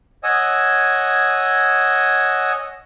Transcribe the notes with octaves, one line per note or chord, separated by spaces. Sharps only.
C#5 D#5 F#5 G#5 D#6 E6